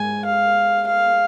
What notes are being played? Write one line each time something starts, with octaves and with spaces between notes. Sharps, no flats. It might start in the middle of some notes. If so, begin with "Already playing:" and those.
Already playing: G#2 G#3 G#5
F5
F5